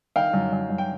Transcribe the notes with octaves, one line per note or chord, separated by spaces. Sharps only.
D#3 F5 G5
F#2
F#2
F#2
G5